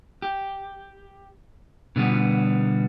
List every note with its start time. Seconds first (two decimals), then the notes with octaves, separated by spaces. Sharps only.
0.22 G4
1.96 B2 D3 G3 B3